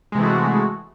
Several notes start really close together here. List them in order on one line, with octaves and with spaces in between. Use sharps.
G#3 C3 E3 A3 F#4